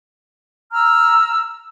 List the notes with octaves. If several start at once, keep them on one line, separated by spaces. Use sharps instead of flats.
A#5 E6 F6